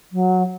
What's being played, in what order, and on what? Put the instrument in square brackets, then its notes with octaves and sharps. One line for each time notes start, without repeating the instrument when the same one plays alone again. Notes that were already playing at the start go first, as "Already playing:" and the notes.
[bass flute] F#3